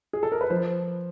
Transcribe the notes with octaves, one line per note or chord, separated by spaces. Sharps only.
G#4
A4
A#4
B4
F3 C5